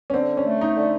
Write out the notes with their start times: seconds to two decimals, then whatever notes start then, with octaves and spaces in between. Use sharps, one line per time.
0.10 C#4
0.13 D3 C4
0.37 C#4
0.45 A3
0.61 D#4
0.76 D3